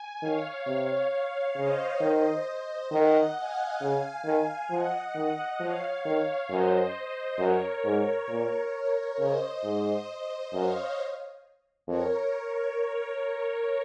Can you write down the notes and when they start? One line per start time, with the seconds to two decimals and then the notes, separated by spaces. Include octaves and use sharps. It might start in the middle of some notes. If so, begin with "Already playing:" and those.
Already playing: G#5
0.22 D#3 C#5 F5
0.66 C3
1.56 C#3 C5 D#5
2.01 D#3
2.46 C5 D#5
2.91 D#3 D#5 F#5
3.36 F5 G#5
3.81 C#3
4.25 D#3 F5 G#5
4.70 F3 D#5 F#5
5.15 D#3
5.60 F3 C#5 F5
6.05 D#3
6.50 F#2 C5 D#5
7.39 F#2 A#4 C#5
7.85 G#2
8.30 A#2
9.19 C#3 C5 D#5
9.64 G#2
10.53 F#2 C#5 F5
11.88 F2 A#4 C#5